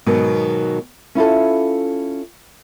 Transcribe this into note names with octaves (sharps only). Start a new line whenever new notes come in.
G#2 B2 D#3 F#3
C#4 E4 F4 A4